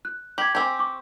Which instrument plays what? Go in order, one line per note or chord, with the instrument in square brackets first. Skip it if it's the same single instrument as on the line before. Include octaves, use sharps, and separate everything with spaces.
[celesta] F#6
[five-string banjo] G4 [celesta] G#6 F#7
[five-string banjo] C4 G4 [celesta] G#5
[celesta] C#6 D6